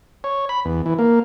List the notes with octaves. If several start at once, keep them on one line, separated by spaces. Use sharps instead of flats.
C#5
B5
E2
E3
A#3